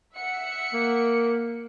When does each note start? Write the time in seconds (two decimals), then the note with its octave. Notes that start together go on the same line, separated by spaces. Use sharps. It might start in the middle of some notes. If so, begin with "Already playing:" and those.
0.14 E5 F#5 C#7
0.73 A#3